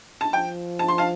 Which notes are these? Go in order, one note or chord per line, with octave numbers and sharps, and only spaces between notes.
A5
F3 G5
A5
C6
F5 A5